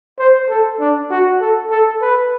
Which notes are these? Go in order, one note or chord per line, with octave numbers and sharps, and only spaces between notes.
C5
A4
D4
F#4
A4
A4
B4